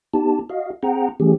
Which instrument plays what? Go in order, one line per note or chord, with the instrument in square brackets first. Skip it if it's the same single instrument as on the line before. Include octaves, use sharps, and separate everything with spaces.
[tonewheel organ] B3 D#4 G4 A5
F#4 D#5 F5
C4 G#4 F#5 G5 A#5
E3 G3 A3 C#4 G4 G#4